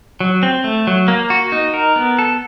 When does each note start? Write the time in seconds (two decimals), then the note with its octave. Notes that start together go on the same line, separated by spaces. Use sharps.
0.20 F#3
0.43 C4
0.64 A3
0.87 F#3
1.08 A#3
1.30 F#4
1.52 D#4
1.74 A#4
1.96 B3
2.19 A4